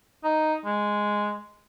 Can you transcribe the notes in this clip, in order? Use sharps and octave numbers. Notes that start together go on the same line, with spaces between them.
D#4
G#3